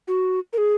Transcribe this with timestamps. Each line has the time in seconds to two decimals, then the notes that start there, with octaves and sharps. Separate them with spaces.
0.07 F#4
0.53 A#4
0.58 G#4